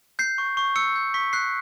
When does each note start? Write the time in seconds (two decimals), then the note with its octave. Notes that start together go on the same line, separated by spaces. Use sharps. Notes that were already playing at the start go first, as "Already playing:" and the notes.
0.19 G6 C7
0.38 C#6
0.57 C#6
0.76 E6 C#7
0.96 G6
1.14 C#6 B6
1.33 F#6 C7